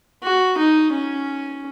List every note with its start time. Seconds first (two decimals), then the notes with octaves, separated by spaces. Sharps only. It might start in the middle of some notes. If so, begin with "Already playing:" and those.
0.23 F#4
0.58 D#4
0.93 C#4